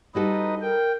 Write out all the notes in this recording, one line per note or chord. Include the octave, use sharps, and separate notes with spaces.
G3 D#4 F#4 A4 B4 D#5
A#4 G5